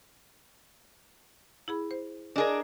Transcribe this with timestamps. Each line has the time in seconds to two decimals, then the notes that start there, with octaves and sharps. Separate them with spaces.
1.68 E4 G#4 B5
1.91 C5
2.36 D4 G#4 A#4 D5 D#5